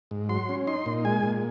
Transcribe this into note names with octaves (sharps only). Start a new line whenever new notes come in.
G#2
F#3 C6
C#4
D#4 C6
A#2
G#3 G#5
A#2